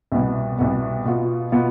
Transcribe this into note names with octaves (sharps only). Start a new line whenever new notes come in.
C2 B2 B3
C2 B2 B3
B2 B3 F4
B2 B3 F4